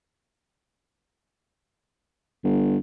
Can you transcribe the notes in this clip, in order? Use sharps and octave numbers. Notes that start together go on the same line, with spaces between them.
G1